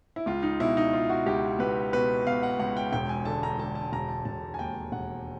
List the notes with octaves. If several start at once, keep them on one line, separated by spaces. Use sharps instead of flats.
E4
C#2 F4
D#4
B2 E4
D#4
B2 F4
F#4
C#2 G4
C#2 B4
B2 B4
B2 F5
F#5
C#2 F#5
G5
E1 G5
G#5
D3 A5
A#5
D3 A5
A5
E1 A#5
A5
E1 A5
G#5
D#2 G5
E1 F#5